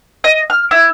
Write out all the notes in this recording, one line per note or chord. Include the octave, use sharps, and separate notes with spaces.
D#5
F6
E4